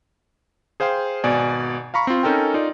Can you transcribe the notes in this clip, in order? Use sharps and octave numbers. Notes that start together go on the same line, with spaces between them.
G#4 C5 F5 G5 C6
G#1 B2 D5 G#5
F5 A#5 B5 C#6
C4 F4
C#4 D#4 A4 A#4 G5
D#4 F4 D5